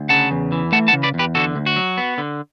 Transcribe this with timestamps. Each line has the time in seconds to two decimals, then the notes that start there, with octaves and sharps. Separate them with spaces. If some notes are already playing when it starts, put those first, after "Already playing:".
Already playing: D2
0.09 C#3 F#5 A5
0.31 E2
0.52 E3
0.72 A3 F#5 A5
0.88 F#5 A5
0.93 C#3
1.03 B4 D5
1.14 E2
1.19 G4 B4
1.35 D3 F#4 A4
1.56 D2
1.66 F#4
1.76 F#3
1.97 B3
2.18 D3